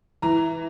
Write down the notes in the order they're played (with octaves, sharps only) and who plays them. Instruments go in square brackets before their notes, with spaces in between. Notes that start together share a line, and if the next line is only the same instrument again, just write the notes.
[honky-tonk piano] E3 [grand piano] A#5